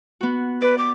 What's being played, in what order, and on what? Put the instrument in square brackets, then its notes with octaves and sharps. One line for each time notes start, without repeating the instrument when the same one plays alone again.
[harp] B3 F#4
[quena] B4 [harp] D5
[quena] D6